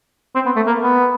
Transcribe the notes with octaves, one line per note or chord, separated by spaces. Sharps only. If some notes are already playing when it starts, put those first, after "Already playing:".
C4
B3
A3
A#3
B3